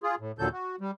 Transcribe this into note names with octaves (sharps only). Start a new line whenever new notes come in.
F4 G#4
A2
D#2 A#2 D3 F#3 A4 G6
F#4
G3